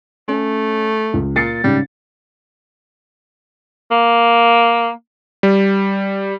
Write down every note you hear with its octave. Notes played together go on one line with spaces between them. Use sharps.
A3 C#4
C#2
A#2 A6 C7 C#7
G#2 C#3 G3
A#3
G3